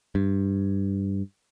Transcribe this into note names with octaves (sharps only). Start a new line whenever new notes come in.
G2